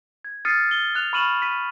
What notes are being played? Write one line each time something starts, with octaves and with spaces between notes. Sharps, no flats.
G#6
D#6 F6 A6 C7 C#7 D#7
G7
F#6 F7
B5 C#6 F6 D#7 E7 F#7
B6 D#7